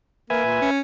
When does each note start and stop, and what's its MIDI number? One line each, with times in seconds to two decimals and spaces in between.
0.30 0.43 58
0.30 0.70 71
0.30 0.70 76
0.30 0.70 80
0.45 0.59 46
0.62 0.81 61